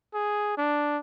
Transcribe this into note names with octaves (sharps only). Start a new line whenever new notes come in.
G#4
D4